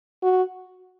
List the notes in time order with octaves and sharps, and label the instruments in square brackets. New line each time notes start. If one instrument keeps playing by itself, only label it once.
[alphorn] F#4